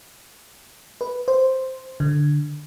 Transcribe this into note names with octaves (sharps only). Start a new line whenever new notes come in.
B4
C5
D3